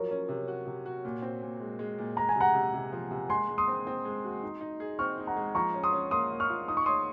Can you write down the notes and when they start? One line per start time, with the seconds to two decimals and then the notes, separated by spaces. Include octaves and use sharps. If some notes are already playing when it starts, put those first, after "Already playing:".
Already playing: F3 F#3 A#4 C#5
0.11 C#4
0.29 C3
0.48 F#4
0.67 C3
0.86 F#4
1.05 A#2
1.22 C4
1.42 A#2
1.60 G#3
1.79 G#3
1.98 A#2
2.17 G#3 A#5
2.29 G#5
2.36 C3 F#5 A#5
2.54 C3
2.74 C3
2.92 F3
3.11 C3
3.29 G#3 G#5 C6
3.49 G#3
3.58 C6 D#6
3.68 C4
3.87 C4
4.05 G#3
4.24 F#4
4.43 D#4
4.61 D#4
4.80 G#4
4.99 C4 C#6 F6
5.18 D#4
5.27 F#5 A#5
5.37 G#3
5.55 F3 A#5 C#6
5.74 C#4
5.83 C6 D#6
5.93 C#4
6.11 A#3 C6 D#6
6.31 A#3
6.40 C#6 F6
6.49 F4
6.68 D#4 D#6
6.77 C#6
6.86 C#5 C6 D#6